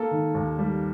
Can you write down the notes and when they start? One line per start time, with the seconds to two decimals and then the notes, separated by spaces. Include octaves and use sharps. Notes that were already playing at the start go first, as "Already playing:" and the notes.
Already playing: A#3 A4
0.11 D#3
0.35 D#2
0.58 G3